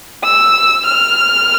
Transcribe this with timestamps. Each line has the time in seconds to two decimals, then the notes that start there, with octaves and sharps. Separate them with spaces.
0.24 E6
0.86 F6